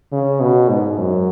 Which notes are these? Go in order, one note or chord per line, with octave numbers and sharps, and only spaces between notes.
C#3
B2
G#2
F#2